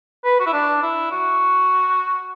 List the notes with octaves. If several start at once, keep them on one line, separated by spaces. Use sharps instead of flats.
B4
F#4
E4
D4
E4
F#4